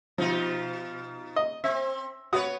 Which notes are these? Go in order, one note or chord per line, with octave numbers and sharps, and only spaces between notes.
B2 F3 D#4 F4
D#5
C4 E5
B3 F#4 B4 C#5 D#6